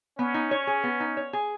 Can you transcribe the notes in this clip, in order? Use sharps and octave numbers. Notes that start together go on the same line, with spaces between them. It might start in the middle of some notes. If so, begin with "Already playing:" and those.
B3 C#4
D#4
C#5
G#4
B3
D#4
C#5
G#4